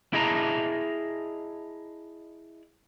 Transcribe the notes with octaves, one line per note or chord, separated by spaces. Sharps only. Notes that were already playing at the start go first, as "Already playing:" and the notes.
E4 G#4 D#5 A5 A#5